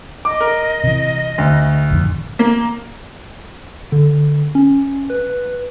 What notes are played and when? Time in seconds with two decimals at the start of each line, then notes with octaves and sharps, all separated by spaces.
0.25 D#5 D6
0.41 A#4
0.84 C3 E3
1.38 D2
1.90 A1 F2 D#3
2.39 A#3
3.92 D3
4.55 C#4
5.10 B4